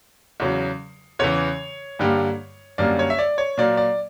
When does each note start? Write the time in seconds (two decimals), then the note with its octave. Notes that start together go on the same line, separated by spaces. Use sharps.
0.40 E2 C#3 F#3
1.19 E2 C#3 E3 C#5
1.99 G2 D3 G3 A#3
2.78 F#2 D3 G3 A#3 D5
2.99 C#5
3.10 E5
3.19 D5
3.38 C#5
3.58 A#2 F#3 A#3 D5
3.77 D5